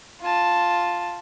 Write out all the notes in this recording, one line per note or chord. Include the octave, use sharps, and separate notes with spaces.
F4 A5